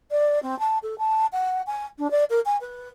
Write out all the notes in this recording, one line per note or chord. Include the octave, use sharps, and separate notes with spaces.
D5
C4
A5
A4
A5
F#5
G#5
D4
D5
A#4
G#5
B4